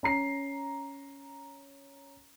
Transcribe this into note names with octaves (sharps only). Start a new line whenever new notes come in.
C#4 A#5 C7